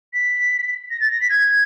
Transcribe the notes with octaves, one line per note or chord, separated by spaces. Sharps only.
B6
A#6
A6
A#6
B6
G#6